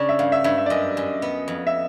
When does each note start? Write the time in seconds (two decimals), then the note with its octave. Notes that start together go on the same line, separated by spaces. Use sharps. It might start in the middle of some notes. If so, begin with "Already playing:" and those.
Already playing: C#3 D4
0.09 E5
0.19 G2 F5
0.32 E5
0.44 G2 E5
0.58 E5
0.66 D5
0.70 F#2 D#5
0.97 F#2
1.22 B3
1.48 F2
1.67 E5